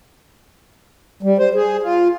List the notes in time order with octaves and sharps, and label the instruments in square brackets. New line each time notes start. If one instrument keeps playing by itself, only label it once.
[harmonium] G3
C5
G#4
F4